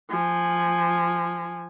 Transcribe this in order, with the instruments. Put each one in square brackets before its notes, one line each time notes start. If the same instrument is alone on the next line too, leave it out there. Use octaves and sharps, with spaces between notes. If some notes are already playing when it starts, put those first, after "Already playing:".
[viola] F3 G#5